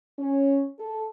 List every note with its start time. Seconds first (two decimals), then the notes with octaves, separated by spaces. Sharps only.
0.19 C#4
0.79 A4